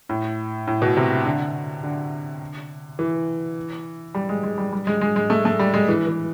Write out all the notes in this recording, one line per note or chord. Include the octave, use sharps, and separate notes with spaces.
A2
A2
B2
C3
D3
D3
E3
G3
G#3
G#3
G3
G3
G#3
G#3
G#3
A3
A3
G3
G#3
E3
E3